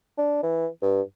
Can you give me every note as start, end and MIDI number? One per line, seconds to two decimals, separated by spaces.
0.18 0.39 62
0.43 0.67 52
0.82 1.02 43